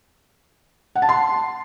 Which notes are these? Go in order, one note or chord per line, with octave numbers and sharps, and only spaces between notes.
F#5
A5
C6